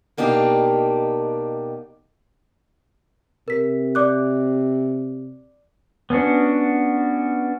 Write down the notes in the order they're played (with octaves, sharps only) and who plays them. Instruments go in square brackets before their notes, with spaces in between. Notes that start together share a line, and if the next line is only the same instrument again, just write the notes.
[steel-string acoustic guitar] B2 A#3 D4 D#4 G4
[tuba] C3 [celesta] A#4 B6
[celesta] D5 D6 F#6
[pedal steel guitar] B3 C#4 D4 F#4